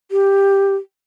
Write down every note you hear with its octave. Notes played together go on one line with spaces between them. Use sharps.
G4